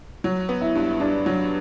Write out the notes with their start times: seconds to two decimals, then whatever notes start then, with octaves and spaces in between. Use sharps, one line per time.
0.24 F#3
0.49 B3
0.61 E4
0.75 G2
1.00 G2 D4
1.26 F#3